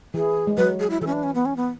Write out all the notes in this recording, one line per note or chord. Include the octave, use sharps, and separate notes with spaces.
E3 G#4
G#3
F#3 B4
G#4
E4
E3 A4
C#4
D4
C#4
B3
C#4
B3